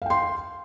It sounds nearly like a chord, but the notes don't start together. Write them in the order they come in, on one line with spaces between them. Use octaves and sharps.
F5 G5 C6